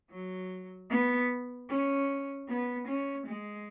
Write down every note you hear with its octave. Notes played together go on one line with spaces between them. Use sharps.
F#3
B3
C#4
B3
C#4
G#3